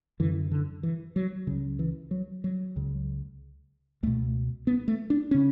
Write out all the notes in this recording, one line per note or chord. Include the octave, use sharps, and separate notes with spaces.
F#2 D3 E3
D3
E3
F#3
C#2 C#3 F#3
E3
F#3
F#3
C#2 C#3
C#2 B2 A3
B3
A3
D4
C#3 C#4